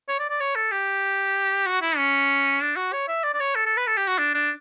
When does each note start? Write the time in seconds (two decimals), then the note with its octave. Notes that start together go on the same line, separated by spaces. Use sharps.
0.08 C#5
0.19 D5
0.30 D5
0.40 C#5
0.56 A4
0.72 G4
1.66 F#4
1.82 E4
1.97 C#4
2.61 D4
2.76 F#4
2.93 C#5
3.08 E5
3.24 D5
3.34 D5
3.40 C#5
3.56 A4
3.66 A4
3.77 B4
3.87 A4
3.97 G4
4.08 F#4
4.18 D4
4.34 D4